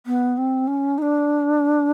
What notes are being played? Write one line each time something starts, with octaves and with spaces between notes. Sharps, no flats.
B3
C4
C#4
D#4
D4